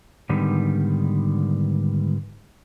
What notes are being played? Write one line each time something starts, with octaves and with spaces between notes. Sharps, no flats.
G#2 D3 D#3 G3 B3